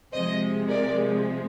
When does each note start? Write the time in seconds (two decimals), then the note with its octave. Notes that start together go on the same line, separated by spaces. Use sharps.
0.13 C3 F3 G#3 C5 D#5
0.68 A#4 D5